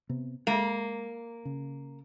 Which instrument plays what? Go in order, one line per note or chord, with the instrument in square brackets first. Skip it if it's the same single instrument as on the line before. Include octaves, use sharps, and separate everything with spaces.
[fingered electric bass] C3 B3
[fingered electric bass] G#3 [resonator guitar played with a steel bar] A#3
[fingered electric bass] C#3